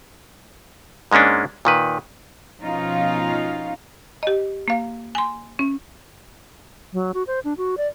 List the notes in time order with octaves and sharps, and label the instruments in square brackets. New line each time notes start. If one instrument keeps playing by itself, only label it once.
[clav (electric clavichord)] G#2 G#3 A#3 C#4 D4
A#2 D#3 B4
[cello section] B2 F3 C#4 D#4 F4 F5
[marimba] G4 D#5
A#3 F5
G#5 C6
C#4
[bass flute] F#3
F#4
C5
D4
F#4
D5